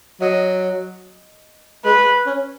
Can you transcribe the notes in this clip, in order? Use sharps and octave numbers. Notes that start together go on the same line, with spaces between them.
F#3 D#5
G#3 B4
C#4